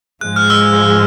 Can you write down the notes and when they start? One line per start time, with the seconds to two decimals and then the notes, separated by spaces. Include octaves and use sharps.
0.21 G#2 F3 G#3 F#6
0.36 F6
0.50 E6